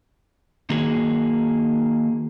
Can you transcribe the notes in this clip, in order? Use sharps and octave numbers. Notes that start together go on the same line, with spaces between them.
D#3 A#3 F#4 G#4